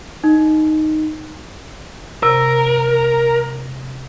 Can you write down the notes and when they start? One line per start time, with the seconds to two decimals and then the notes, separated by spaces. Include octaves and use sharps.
0.24 D#4
2.23 C3 A#4